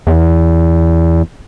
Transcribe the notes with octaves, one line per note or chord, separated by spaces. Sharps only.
E2